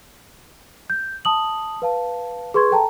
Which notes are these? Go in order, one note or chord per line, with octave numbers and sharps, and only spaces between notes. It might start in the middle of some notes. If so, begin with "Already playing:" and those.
G6
A5 D#6 F#7
B4 F5 A5
G#4 B4 C6 C#6 G#6
A4 G5 A5 A#5